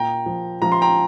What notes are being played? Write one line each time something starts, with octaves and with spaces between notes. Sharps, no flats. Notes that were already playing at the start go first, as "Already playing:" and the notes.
Already playing: A#2 G5 A#5
F3
F3 A#5
C6
G5 A#5